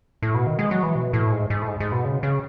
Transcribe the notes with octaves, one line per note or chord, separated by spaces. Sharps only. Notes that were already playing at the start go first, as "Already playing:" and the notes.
A2
B2
D#3
G#3
F#3
E3
B2
A2
G#2
G#2
A2
G#2
G#2
B2
C#3
C#3